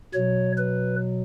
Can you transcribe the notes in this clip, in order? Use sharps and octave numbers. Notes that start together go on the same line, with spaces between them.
B2 F#3 C#5
B4